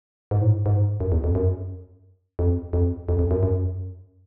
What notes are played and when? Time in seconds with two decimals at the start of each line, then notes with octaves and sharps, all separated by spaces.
0.31 G#2
0.42 A2
0.51 G#2
0.66 G#2
1.00 F#2
1.12 E2
1.24 F2
1.35 F#2
2.39 F2
2.73 F2
3.09 F2
3.19 F2
3.31 F#2
3.43 F#2